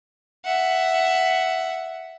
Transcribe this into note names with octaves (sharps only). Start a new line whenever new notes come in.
E5 F#5